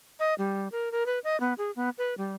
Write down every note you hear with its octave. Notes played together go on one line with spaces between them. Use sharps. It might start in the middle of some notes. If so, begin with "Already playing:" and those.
D#5
G3
A#4
A#4
B4
D#5
B3
G#4
B3
B4
G3